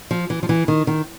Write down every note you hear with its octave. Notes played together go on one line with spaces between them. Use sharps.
F3
E3
F3
E3
D#3
D#3